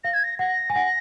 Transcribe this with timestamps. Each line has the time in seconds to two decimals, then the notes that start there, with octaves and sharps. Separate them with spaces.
0.04 F5 A#6
0.14 G#6
0.24 A#6
0.39 F#5 A#6
0.70 G#5
0.76 F#5